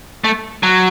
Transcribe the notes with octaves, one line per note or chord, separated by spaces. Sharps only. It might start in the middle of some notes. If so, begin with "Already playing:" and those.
A3
F#3